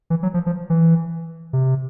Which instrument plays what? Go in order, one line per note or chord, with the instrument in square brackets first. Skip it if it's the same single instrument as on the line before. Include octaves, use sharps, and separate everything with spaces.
[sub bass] E3
F#3
F3
F3
E3
C3